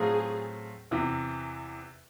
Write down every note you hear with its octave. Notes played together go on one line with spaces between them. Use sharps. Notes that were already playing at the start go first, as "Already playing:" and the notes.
Already playing: A2 F#3 A3 C4 F4 G#4
E2 C3 E3